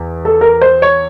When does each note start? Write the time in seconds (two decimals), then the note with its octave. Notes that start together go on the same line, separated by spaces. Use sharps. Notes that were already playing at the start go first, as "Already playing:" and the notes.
Already playing: E2
0.25 A4
0.41 A#4
0.61 C5
0.82 C#5